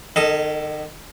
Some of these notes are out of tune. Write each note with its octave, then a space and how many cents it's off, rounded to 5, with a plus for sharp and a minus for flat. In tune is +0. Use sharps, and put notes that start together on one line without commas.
D#3 -35 A4 +0 D#5 +0